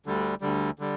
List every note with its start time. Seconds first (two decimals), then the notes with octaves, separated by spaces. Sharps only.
0.06 D2 D3 G3
0.41 D2 D3 G3
0.79 D3 G3